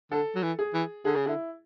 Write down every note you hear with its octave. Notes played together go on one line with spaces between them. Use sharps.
D3 A4
F#3
E3
G#4
E3
D3 G#4
C#3
D3 E4